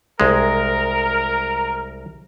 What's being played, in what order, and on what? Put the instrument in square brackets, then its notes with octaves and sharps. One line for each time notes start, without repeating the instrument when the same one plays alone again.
[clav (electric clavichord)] C2 G#3 [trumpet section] A#4